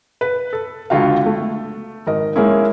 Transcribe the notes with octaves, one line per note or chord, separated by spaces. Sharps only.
B4
A4
C#2 D3 F4 F#4 F5
A3
G#1 A#4 D#5
G#2 G#3 A#3 C#4 E4